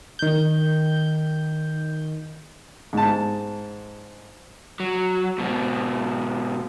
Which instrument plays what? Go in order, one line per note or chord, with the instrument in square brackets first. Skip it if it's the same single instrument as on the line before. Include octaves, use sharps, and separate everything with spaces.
[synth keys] D#3 G6
[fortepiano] G#2 A5
[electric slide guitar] F#3
G#2 B2